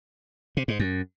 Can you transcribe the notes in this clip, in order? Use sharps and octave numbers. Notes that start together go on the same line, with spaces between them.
C3
G#2
F#2